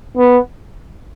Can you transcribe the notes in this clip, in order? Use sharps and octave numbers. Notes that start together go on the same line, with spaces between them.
B3